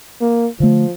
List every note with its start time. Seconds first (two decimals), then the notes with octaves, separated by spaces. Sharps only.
0.21 A#3
0.60 D3 F3 A3